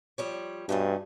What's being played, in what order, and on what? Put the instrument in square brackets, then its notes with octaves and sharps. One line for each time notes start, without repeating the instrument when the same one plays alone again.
[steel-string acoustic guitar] F3 G3 C#5
[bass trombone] G2 [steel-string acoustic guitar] B2 A3 C#4